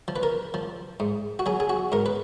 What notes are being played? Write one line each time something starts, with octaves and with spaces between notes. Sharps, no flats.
F3
B4
A#4
F3
G#2
F#4
F#3 G#4
G#4
F#4
G#2 A#4
B4